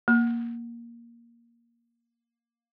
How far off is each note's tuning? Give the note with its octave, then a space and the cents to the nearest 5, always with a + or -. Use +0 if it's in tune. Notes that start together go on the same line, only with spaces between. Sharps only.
A#3 +10